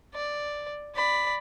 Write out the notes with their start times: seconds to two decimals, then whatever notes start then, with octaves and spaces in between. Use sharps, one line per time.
0.14 D5
0.95 D5 B5